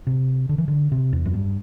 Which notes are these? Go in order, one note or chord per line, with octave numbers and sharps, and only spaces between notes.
C3
D3
E3
D3
C3
E2
F#2
G2